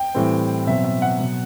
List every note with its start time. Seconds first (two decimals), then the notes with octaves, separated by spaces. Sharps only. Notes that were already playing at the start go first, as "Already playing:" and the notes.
Already playing: G5
0.15 A2 E3 G3 C4
0.66 B2 F#3 C4 E5
0.84 E5
1.02 F#5
1.20 B2 F#3